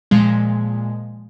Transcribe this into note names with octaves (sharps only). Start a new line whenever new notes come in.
A#2 F3 G#3